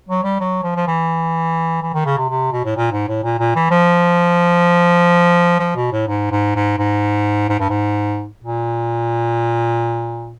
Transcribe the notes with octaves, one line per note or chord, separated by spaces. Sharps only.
F#3
G3
F#3
F3
F3
E3
E3
D#3
C#3
C3
C3
B2
A2
A#2
G#2
A2
A#2
A#2
E3
F3
F3
B2
A2
G#2
G#2
G#2
G#2
G#2
G2
G#2
A#2